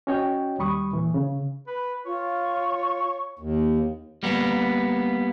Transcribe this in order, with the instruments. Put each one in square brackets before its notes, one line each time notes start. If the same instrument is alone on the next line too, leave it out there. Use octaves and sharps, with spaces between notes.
[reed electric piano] C#4 F#4 C#5 D#5 G5
D#2 G3 B5 C#6 D#6
A#2 E3
C#3
[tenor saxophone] B4
[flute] F4 [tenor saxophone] C#5
[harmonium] D#2
[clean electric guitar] G3 A#3 B3